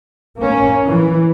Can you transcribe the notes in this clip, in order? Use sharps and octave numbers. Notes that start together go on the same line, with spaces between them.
A#3 C#4
E3